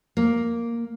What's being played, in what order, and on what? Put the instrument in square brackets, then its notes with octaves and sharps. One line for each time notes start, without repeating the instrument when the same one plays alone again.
[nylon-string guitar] A#3